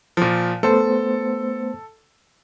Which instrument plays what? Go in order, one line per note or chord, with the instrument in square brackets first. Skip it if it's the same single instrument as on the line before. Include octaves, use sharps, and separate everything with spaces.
[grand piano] A#2 F3
[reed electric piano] A3 B3 C5 [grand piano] A4